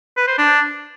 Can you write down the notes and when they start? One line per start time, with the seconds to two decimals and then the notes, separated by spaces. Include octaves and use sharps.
0.17 B4
0.28 C5
0.38 D4